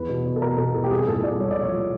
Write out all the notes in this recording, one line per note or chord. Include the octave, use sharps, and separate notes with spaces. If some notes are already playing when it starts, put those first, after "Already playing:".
Already playing: E2 B4
B2
B2
A4
B2 A#4
B2 A4
E2 A4
G4
C2 G#4
A#2 A4
C2 D5
C2 C#5
D5
F3
C#5
F3